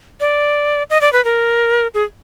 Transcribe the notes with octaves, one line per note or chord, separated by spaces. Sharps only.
D5
D#5
D5
B4
A#4
G#4